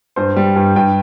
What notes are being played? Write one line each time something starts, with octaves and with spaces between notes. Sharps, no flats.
G2 C5
G3
G2
G2 G5